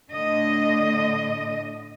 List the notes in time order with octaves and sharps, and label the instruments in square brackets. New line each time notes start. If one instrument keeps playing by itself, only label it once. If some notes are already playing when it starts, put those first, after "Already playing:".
[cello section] A2 D3 D#5